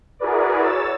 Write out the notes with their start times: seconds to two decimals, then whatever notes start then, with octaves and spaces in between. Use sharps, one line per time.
0.19 E4 F#4 G#4 A#4 B4 D5
0.62 C#5 E6 A6